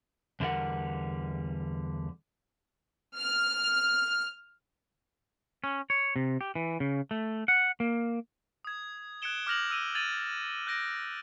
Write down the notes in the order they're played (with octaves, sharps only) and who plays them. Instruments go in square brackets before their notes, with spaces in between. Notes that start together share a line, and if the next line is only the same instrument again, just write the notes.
[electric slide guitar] E2 D3 G3 F4 A#4 F#5
[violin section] F6
[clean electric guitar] C#4
C#5
C3
G4
E3
C#3
A3
F#5
A#3
[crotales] D#6 G#6
F#6 G#6 C#7 D7 E7 G7
D6 F6 G6 A#6 F7 F#7
E6 F6 D#7 F7
G#6 A6 D#7 F7 F#7
F#6 G6 A#6 D7